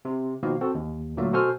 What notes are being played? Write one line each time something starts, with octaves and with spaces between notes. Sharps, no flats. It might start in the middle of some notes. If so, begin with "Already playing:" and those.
C3
B2 D#3 F3 A#3
C4 F#4 A4
D#2
A#2 D3 F#3 A3 A#3
B2 F#4 A4 C5 G#5 F6